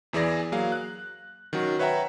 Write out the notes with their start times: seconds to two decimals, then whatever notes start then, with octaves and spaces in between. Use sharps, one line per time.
0.13 E2 E3 G#4 D5 A#6
0.52 F#3 A#3 G#4 A#4 F5
0.72 F#6
1.53 D#3 F#3 C#4 F#4
1.79 B4 C#5 E5 F#5 G5 A#5